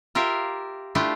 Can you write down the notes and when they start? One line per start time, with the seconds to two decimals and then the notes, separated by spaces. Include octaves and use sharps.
0.15 F4 G4 A#4 E5 F5
0.95 A3 D4 E4 F4 G4